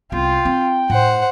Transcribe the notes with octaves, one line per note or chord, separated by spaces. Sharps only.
C2 B3 F4 G5
C4
A2 C5 F#5